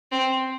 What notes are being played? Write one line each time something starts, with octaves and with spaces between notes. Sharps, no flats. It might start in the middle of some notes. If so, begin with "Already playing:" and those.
C4